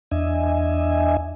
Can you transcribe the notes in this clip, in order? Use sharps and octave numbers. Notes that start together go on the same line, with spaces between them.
E2 D4 D#5 E5 G#5